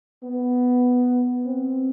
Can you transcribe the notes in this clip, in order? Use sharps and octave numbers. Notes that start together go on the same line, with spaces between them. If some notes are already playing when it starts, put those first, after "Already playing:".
B3
C4